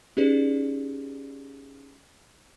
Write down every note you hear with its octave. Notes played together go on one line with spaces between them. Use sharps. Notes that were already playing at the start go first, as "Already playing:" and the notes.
C#4 D#4 G4 G#4 B4 D5